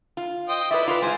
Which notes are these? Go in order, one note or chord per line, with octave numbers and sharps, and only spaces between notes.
F4
C5 D#5 G5
E4 B4 D5 E5
F4 B4
G#3 F4 C5 G#5